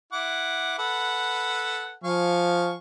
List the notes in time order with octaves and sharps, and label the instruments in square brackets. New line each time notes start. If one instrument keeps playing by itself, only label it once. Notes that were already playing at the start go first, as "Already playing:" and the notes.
[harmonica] E4 F#5 D6
A4 B4 F#5
[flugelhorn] F3 [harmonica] F5 G#5 C#6